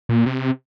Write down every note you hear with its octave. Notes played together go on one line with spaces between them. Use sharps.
A#2
C3